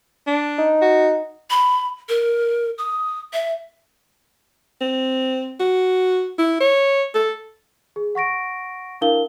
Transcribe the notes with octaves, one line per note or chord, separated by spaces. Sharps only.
D4
D#4
F#4
B5
A#4
D#6
E5
C4
F#4
E4
C#5
A4
G#4
F#5 C#6 A#6 D7
D4 E4 A#4 F5 G7